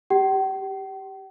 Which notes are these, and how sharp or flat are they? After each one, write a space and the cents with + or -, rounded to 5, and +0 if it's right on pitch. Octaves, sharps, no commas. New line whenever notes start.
G4 +0 G5 -45